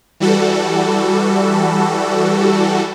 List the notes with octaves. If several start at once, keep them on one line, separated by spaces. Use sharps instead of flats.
E3 G3 F#4 A4